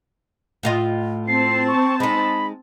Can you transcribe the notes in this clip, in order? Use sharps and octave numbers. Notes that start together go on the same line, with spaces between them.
A2 F4 D#5
C4 A5 C7
C#6
G#3 D#4 B5